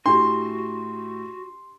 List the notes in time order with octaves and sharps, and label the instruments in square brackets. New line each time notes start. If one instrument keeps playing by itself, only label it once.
[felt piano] A2 [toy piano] D4 G4 [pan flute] F#4 [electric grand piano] C6